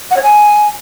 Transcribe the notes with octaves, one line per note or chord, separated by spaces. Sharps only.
F#5
C#5
G#5